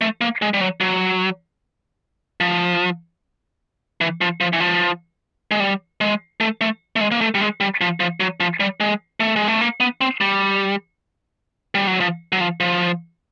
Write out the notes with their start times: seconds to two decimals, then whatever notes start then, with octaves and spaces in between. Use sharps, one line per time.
0.01 A3
0.21 A#3
0.42 G#3
0.54 G3
0.61 F#3
0.81 F#3
2.40 F3
4.01 E3
4.21 F3
4.41 F3
4.53 E3
4.60 F3
5.51 G#3
5.60 G3
6.01 G#3
6.40 A3
6.61 A3
6.96 A3
7.01 G#3
7.12 A#3
7.21 A3
7.35 G3
7.41 G#3
7.60 G3
7.81 F3
8.00 F3
8.20 F#3
8.40 F3
8.60 G3
8.80 G#3
9.20 A3
9.36 G#3
9.48 A3
9.61 A#3
9.80 B3
10.01 C4
10.21 G3
11.75 G3
11.87 F#3
12.00 F3
12.32 F#3
12.41 F3
12.60 F3